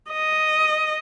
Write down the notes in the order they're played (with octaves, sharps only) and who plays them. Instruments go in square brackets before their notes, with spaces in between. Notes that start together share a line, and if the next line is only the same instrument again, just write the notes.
[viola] D#5